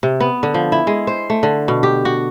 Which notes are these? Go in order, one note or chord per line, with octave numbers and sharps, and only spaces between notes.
C3
B3
D3
F3
E4
G#3
C5
A3
D3
B2
G4
F#4